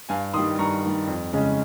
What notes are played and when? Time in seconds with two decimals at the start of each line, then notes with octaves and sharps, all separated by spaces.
0.09 G2 F5 G#5
0.33 D#3 G3 C6 D#6
0.59 G2 A#5 C#6
0.83 D#3 G3
1.07 F2
1.33 C#3 G#3 C#4